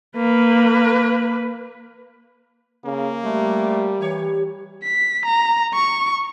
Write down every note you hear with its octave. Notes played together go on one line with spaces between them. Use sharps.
A#3 B4
C#3 A#3
G3 A3
E3 G4 C#5
B6
A#5
C#6